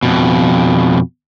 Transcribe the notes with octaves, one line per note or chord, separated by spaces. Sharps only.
F2 B2